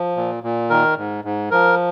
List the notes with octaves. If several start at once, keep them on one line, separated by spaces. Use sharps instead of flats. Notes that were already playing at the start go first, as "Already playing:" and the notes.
Already playing: F3
A#2
A#2
D#3 A#4
G#2
G#2
F3 A#4